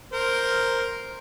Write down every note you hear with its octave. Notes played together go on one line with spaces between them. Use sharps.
A#4 C5